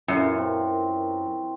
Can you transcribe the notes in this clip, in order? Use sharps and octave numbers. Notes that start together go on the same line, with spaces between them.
F#2 A#2 E3 F#4
C4